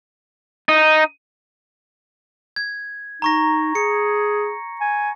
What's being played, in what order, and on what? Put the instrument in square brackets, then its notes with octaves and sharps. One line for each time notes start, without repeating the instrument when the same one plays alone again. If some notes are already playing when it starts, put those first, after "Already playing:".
[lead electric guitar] D#4
[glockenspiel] G#6
[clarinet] D#4 [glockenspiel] A#5 C#6 A#6
[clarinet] G#4 [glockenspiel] C#7
[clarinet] G#5